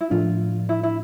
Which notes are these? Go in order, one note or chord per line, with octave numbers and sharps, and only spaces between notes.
E4
A2 F3 A3 D4 F4
E4
E4